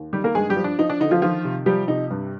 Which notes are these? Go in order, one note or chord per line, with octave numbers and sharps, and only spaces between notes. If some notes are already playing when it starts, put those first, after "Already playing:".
Already playing: D#2
D#3 G3 G4
A#3 A#4
G2 G#3 G#4
G3 G4
F3
D4
F3 D#4
D4
D3 D#4
F3 F4
D#3 F3 F4
C3
F3 G3 G4
C3 D#4
G2